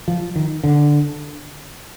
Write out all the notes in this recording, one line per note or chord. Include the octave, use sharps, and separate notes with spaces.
F3
D#3
D3